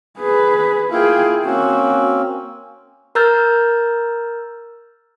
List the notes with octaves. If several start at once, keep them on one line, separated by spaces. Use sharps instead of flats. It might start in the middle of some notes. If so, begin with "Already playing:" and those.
G#4 B4
A#3 E4 F4 G#4 G5
A#3 C4 C#4 F#4
A#4 A#5 E6 F6 G6 A6